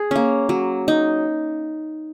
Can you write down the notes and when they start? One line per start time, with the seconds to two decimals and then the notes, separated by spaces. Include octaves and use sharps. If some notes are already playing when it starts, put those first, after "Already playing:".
Already playing: G#4
0.11 A#3 C#4
0.49 F#3
0.88 D#4